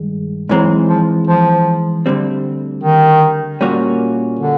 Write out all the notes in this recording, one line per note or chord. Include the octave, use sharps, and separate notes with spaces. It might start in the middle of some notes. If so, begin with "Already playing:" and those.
Already playing: G2 D#3 G#3
G#2 E3 F#3 G#3 C4
F3
F3
D2 D3 G3 C4
D#3
A#2 G3 A#3 C#4 F#4
D3